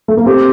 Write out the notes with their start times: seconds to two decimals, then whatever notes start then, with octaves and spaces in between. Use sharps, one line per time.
0.08 A3
0.17 A#3
0.26 C4 G4